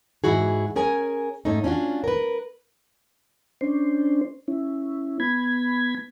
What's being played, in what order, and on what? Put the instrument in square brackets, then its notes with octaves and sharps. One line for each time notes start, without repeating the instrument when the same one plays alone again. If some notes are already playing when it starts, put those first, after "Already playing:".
[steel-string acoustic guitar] G#2 C#3 E3 E4 F#4 G#4
C#4 G#4 A#4 G#5
G#2 A3 C#4 D#4
C#4 D4 F4 F#4
A#4 B4
[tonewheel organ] C#4 D4 C5
C#4 E4
B3 B5 G#6